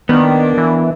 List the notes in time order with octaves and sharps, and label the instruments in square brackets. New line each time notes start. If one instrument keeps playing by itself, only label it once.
[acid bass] D#3 [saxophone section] A#3 D4 [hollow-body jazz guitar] B3
[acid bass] E3